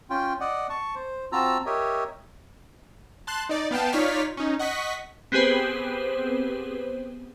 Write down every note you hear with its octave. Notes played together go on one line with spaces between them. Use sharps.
C#4 F4 G5
D5 D#5 F#5
A5 C#6
C5
C4 F4 F#4 A5 A#5 E6
G4 A#4 C#5 D#5 E5
A5 C6 F#6
D#4 D5
B3 F5 G5 A5
D#4 F4 C#5 D5 F6 B6
C#4 D#4
D#5 F#5 C#6 B6
B3 C4 G4 G#4 B4 C5